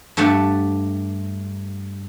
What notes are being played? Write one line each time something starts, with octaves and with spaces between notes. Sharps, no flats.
G2 A3 G4 F#5 A5